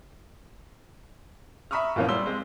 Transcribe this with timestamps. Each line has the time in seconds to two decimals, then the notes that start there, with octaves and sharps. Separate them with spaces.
1.71 E5 A#5 B5 C#6 D#6 F6
1.96 A#2 E3 F3 A#3 B3 C#4
2.08 G3 C6 E6 G7
2.26 G#3 C4